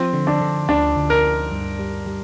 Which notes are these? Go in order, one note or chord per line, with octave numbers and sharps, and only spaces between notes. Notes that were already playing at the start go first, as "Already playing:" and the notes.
Already playing: F3 C4
D3
D4
D3
D2 D4
D2
A#4
D2
G2
G3
G3